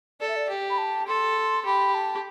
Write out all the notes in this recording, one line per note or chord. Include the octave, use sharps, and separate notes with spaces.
A4 D5
E5
D5
G4
B5
A5
A4 C6
G4 B5
A5